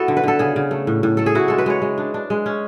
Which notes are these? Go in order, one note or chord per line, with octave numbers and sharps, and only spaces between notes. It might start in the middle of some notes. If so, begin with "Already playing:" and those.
Already playing: B3 E4 F#4 A4
D3
B4
D3 A4
C#3 G#4
C#3
A3
A2
A2
A3 A4
G#4
E4 F#4
G#3 A4
B4
G#3 C#5
G#3
D4
D4
G#3
C#4